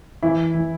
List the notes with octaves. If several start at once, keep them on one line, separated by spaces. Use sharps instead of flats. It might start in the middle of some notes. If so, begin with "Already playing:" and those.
E3 E4
E3